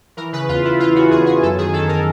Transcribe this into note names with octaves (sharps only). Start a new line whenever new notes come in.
E3 A#4
C#3 B4
E2 F4
E2 E4
E3 F4
C#3 F#4
E2 G#4
E2 G#4
F#2 A4
D#3 G#4
D#3 A4
A#4